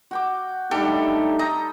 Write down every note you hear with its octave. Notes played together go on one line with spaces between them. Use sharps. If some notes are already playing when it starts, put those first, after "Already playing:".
F#4 G5 D6
G3 A3 D4 D#4 G4 A4
D#5 G5 A#5